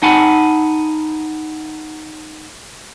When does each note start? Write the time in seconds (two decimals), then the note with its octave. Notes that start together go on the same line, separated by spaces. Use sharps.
0.02 D#4 F#5 G#5 A5 B5